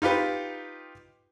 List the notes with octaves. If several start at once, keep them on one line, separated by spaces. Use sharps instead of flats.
D#4 F4 G4 B4